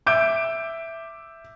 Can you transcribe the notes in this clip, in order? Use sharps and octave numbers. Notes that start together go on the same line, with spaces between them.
E5 D6 E6 G6 D7